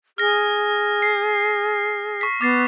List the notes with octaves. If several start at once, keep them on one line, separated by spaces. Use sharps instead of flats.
G#4 F6 A#6
C7
C#6 B6
B3 D6 A6 C7